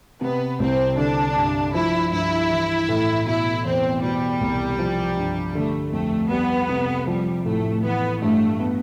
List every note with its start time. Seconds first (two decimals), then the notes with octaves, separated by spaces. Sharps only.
0.21 C3 B3
0.60 C2 C4
0.98 D3 D4
1.36 G2
1.73 F3 E4
2.12 G2 E4
2.50 E3
2.89 A2
3.26 B2 E4
3.65 E2 C4
4.03 B2 G3
4.41 C2
4.79 F3
5.17 G2
5.55 D3 A3
5.93 F2 A3
6.31 G3 B3
6.69 C3
7.07 F3 G3
7.46 A2 A3
7.84 E3 B3
8.22 G2 A3
8.60 B3